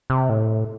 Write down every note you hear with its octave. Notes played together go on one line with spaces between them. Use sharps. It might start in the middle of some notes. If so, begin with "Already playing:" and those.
C3
A2